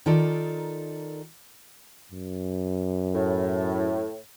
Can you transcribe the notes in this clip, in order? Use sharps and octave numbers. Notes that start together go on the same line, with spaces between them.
D#3 D#4 F4 A4 A#4 D5
F#2
A2